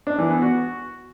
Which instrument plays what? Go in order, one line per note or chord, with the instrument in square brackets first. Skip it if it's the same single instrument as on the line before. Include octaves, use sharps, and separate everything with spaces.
[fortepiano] D4
E3
B3
F#4